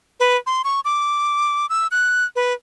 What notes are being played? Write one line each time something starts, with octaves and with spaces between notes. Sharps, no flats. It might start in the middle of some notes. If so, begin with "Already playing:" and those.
B4
C6
C#6
D6
E6
F#6
B4